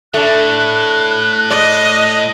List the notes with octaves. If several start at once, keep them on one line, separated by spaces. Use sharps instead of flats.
A2 A3 D4 F#6
D5 D#5